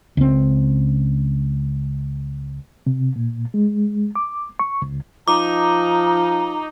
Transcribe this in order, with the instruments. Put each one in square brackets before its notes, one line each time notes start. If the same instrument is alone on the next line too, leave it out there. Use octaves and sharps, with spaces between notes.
[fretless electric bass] C#2 C4
[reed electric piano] C3
A#2
G#3
D6
C#6
C#2
[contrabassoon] F3 [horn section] D#4 [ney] A#5 [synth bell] D6